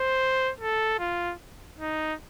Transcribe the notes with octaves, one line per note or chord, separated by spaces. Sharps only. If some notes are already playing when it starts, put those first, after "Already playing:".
Already playing: C5
A4
F4
D#4